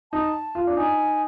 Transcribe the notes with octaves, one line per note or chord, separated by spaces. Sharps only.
D#4 A5
F4
D4
D#4 G#5